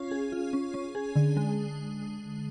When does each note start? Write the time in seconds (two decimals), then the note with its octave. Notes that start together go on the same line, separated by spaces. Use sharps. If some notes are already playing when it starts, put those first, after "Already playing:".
Already playing: C#4 F4
0.11 G#4
0.32 F4
0.53 C#4
0.74 C#4
0.95 G#4
1.16 D3
1.37 G#3